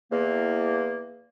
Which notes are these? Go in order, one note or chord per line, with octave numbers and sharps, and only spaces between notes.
E2 A#3